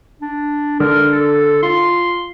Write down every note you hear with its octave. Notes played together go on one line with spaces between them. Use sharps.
D4
D3 A#4
A4
F4 C6